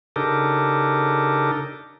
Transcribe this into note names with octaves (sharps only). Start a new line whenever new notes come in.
C#3 D4 D#4 G4 A4 A#4